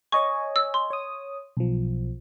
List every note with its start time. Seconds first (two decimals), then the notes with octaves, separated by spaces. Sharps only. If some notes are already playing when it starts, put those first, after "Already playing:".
0.12 C#5 D#5 G#5 C#6
0.56 E6
0.74 C6
0.90 C#5 D#6
1.57 B1 F3